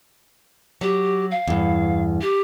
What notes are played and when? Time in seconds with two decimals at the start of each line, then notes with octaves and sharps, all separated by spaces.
0.81 F#3 G4
1.31 F5
1.48 E2 G2
2.21 G4